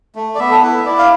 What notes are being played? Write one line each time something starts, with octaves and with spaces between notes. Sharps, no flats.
A3
D5
B3 E5
A4
E4 B4
E5
E4 D5
F5